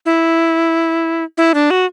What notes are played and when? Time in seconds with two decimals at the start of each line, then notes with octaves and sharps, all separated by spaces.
0.06 E4
1.38 E4
1.54 D4
1.71 F#4